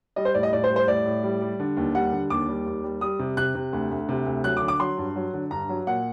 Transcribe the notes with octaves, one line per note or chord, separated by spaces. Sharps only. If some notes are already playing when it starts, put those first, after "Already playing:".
G3 D#5
C5
A2 D5
D#5
A2 D5
C5
G3
C5
A2 D5
A2
G3
G3
D3
D#2
G3 F#5
D3
D#2 D6
G3
D#2
G3
G3 D#6
C3
C3 F#6
C3
D2
D2
C3
D2
F#3 F#6
D6
D3
D6
F#3 C6
G2
F#3
D3
G2 A#5
F#3
A#2 F#5